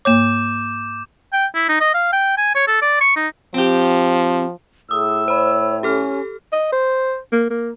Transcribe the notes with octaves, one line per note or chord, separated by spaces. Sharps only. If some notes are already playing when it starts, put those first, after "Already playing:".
G#2 A#3 C#5 D6 G6 E7
G5
E4
D#4
D#5
F5
G5
G#5
C#5
A4
D5
C#6
D#4
F3 C4 G4
A2 G#4 D#6 E6
C5 C#5 B5
C#4 G4 A4 F6
D#5
C5
A#3
A#3